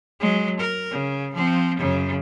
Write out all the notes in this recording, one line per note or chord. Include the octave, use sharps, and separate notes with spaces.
F#3 G#3
A#4
C#3
F3 C4
F#2 C#3